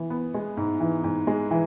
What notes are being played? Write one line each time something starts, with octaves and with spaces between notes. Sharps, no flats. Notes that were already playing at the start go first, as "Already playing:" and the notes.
Already playing: E3 B3
B3
G#3
G#2
E3
G#2
G#3
E3